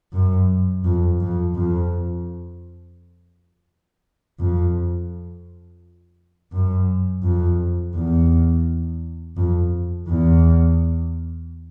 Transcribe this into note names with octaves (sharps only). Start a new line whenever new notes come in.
F#2
F2
F2
F2
F2
F#2
F2
E2
F2
E2